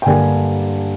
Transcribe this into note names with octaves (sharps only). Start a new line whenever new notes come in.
G5
G2 D3 G3 A#3 G#5